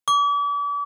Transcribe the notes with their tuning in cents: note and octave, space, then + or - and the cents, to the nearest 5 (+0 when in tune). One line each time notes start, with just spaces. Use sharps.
D6 -40